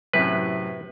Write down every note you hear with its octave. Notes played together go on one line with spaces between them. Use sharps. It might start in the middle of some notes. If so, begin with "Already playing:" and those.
F#2 A2 C3 B4